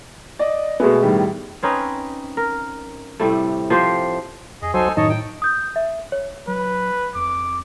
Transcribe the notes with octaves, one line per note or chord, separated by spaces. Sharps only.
D5 D#5
B2 G#3 A3 B3 G#5
A2 D#3 G3
C4 C#4 D#4 B4
A#4
A2 C3 G3 A3
F3 G4 C5
F2 G#4 D#5
C2 F#3 D#4 A4 C5 G#5
F#2 A2 D#3 D#4 C#5 D#5 A5
G5
D#6 G6
E5
C#5
F#3 B4
F2 D6